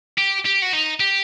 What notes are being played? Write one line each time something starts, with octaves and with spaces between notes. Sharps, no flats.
G4
G4
F#4
D#4
G4